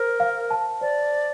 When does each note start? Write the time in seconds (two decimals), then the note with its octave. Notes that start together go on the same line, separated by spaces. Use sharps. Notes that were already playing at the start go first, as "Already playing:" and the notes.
Already playing: A#4 C5
0.20 F5
0.51 A5
0.81 C5 D5
1.12 C5